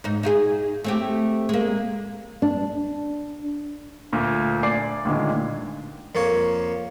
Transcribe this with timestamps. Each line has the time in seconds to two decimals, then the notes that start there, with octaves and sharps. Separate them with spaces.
0.04 G#2 D#4
0.23 D#4 F4 G#4
0.84 A3 C4 G4
1.49 G#3 A#3
2.42 D4
4.12 D2 A#2
4.63 D5 G#5 D6 C7
5.05 A1 A#2 D3 D#3 G#3
6.15 F2 A#3 C#5